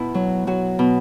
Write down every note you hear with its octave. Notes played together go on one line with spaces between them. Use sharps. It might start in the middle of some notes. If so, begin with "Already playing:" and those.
Already playing: B2 E4
F#3
F#3 F#4
B2